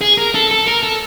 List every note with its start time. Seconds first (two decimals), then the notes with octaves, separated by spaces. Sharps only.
0.01 G#4
0.17 A#4
0.34 A4
0.50 A4
0.66 A#4
0.83 A4